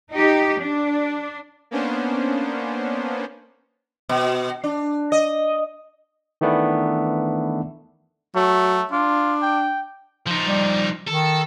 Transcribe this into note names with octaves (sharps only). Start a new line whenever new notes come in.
D#4 G4
D4
A#3 B3 C#4 D4 C5
B2
D4
D#5
D#3 E3 A3 B3 D4
F#3 A3
D4 F4
G5
F3 D#4
G3
D#3 A4